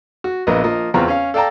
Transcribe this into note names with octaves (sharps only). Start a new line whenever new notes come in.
F#4
A#1 A#3 B3 F4 D#5
F3 A#3 D#5
E2 C4 F4 B4 A#5 C#6
C#4 F5
A4 D5 F5 G5 A5 A#5